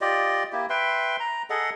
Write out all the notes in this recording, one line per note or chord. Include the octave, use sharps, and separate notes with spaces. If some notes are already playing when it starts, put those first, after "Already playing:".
F4 G4 D5 D#5
A#3 E4 G4
B4 E5 G5 C6
A#5
G#4 A4 D#5 F#5